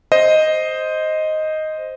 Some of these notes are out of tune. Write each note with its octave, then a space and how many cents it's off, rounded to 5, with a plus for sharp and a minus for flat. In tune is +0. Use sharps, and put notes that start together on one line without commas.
C5 +0 D#5 +0